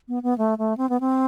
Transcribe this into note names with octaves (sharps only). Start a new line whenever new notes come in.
B3
B3
A3
A3
C4
B3
C4